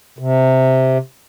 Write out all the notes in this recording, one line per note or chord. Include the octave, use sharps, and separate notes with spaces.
C3